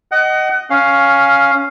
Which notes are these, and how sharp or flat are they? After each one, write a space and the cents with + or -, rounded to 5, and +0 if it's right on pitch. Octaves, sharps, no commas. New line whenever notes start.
D#5 +0 F#5 +30
C#4 +5 F5 +0